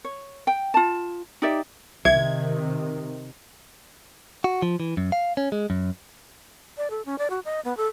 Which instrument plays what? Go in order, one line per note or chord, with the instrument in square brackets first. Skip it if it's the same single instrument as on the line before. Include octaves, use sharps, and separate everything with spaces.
[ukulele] C#5
G5
F4 A5
D#4 G4 D5 E5
[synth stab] C2 G#6 [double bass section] C3 D#3 [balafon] E5
[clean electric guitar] F#4
F3
E3
F#2
F5
C#4
G#3
F#2
[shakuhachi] D5
A4
C#4
D5
F#4
D#5
B3
A4